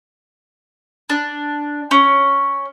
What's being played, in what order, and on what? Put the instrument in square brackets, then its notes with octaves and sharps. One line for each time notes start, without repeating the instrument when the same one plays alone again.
[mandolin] D4
C#4